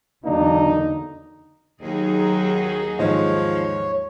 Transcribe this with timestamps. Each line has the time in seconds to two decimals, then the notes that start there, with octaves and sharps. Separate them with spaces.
0.25 E2 D3 F#3 A#3 D4 D#4
1.82 D#2 F#3 D#4 G#4
2.99 D#2 G#2 F3 C#5 D#5